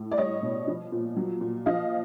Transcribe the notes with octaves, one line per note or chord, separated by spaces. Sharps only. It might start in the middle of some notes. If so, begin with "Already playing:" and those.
Already playing: A2
D5
G3 C#5 D#5
B2
F3
A#2
F#3
A#2
F3 D#5 F5